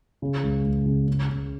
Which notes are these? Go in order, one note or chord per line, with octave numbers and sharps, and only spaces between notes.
C#3
C#2
C#2
C#3
C#3
C#3